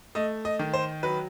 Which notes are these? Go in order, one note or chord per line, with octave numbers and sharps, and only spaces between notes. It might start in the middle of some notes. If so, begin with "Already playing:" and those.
A3 D#5
D#5
D#3
C5
F#3 B4